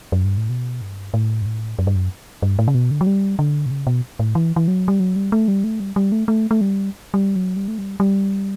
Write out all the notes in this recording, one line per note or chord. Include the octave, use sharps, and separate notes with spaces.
F#2
G2
A2
B2
G2
A2
G2
A2
F#2
G2
F#2
G2
A2
C#3
B2
D3
F#3
G3
D3
B2
C#3
B2
A2
E3
E3
F#3
G3
F#3
G3
A3
G3
A3
G3
G3
A3
A3
A3
G3
G3
F#3
G3
A3
G3
G3